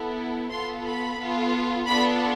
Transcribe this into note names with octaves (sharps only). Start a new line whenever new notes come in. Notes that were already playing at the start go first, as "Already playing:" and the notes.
Already playing: B3 E4 A4
B3 F4 A4 C6
B5
B3 F4 A4
B3 D4 F4 A4 B5